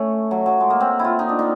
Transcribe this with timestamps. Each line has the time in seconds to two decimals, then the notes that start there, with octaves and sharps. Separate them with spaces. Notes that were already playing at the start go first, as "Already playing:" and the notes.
Already playing: A3 C#4
0.31 F#3
0.46 F#3
0.60 G#3
0.70 A#3
0.80 C4
0.99 E4
1.04 F4
1.19 D#4
1.29 D4
1.39 D#4